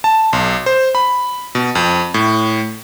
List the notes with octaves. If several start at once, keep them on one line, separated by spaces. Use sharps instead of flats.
A5
B1
C5
B5
B2
F2
A2